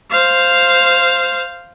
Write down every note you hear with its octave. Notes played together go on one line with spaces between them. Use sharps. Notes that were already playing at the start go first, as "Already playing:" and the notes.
C5 F5